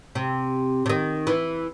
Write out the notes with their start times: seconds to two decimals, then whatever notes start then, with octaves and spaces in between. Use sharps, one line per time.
0.15 C3
0.86 C3
0.89 D#3
1.27 E3